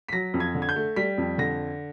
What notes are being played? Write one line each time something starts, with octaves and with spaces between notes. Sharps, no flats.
B6
F#3 A#6
F2
G#6
D3
G#6
G6
A3
G3 B6
F2
D3 A#6